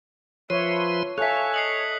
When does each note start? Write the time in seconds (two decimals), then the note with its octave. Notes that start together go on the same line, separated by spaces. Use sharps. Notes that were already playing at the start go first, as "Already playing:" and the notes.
0.50 F3 B4 C#5 E5 C6
1.18 A4 C#5 E5 F5 G#5 F#6 B6
1.54 D#5 C7 C#7 F#7